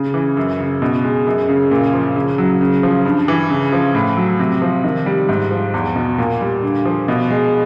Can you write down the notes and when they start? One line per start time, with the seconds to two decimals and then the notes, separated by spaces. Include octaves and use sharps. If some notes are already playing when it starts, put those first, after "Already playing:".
Already playing: C#3
0.14 E3
0.37 F#2
0.59 C#3
0.82 B2
1.04 G#3
1.27 F#2
1.49 C#3
1.71 A#2
1.94 F3
2.16 C#3
2.38 F#3
2.61 C#3
2.83 F3
3.05 G2
3.28 E3
3.50 C#3
3.72 F3
3.95 A2
4.17 F#3
4.39 C3
4.62 F3
4.84 D#3
5.06 G3
5.29 G#2
5.51 F3
5.74 E2
5.96 B2
6.18 A#2
6.41 G3
6.63 D3
6.85 F3
7.08 B2
7.30 G#3